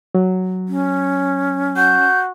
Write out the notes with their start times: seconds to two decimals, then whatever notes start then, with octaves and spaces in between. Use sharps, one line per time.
0.15 F#3
0.68 C#4
1.77 F#4 G6